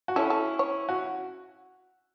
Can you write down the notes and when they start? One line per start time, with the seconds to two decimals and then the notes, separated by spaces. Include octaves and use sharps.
0.08 F#4
0.16 C#4 E4 A4
0.30 A4
0.59 C#5
0.89 F#4